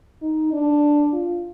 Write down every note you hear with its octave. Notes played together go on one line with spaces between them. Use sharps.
D#4
D4
F4